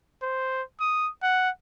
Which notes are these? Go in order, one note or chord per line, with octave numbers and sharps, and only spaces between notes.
C5
D#6
F#5